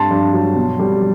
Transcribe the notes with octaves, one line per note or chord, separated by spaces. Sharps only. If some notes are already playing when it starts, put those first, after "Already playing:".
Already playing: G2 A5 C6
G2
F#3
B2
G3